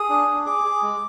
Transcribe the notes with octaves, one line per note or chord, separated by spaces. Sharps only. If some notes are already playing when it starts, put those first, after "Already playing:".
Already playing: G#4 D#6
D4
D4
G#4 D6
G#4
G#3